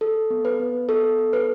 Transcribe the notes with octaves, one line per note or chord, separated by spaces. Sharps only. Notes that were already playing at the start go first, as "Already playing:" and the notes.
A4
B3
B4
B3
B3 A4
A4
B4